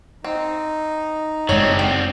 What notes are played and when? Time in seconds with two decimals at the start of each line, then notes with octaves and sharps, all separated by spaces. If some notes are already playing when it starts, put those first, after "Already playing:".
0.24 C4 D#4
1.49 F#1 D3 G#3 C4 C#5
1.79 G5